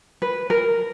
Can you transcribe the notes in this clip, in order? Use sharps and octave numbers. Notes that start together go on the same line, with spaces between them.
B4
A#4